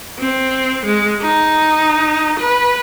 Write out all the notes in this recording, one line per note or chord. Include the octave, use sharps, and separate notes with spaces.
C4
G#3
D#4
B4